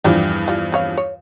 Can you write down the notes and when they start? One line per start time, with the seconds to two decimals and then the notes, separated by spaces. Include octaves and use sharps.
0.04 E2 G2 D3 F3 G4 D5
0.48 G3 F4
0.72 C4 C#5 F5
0.97 C#5